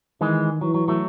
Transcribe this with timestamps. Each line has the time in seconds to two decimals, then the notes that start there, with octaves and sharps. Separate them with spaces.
0.21 D#3 E3 G#3
0.61 E3 F#3
0.74 F#3
0.88 F#3 A3